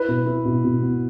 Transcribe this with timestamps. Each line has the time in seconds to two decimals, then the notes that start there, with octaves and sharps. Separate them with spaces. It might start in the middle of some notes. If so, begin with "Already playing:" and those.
Already playing: E4 B4
0.08 B2
0.26 E4
0.45 B2
0.65 B2
0.82 B3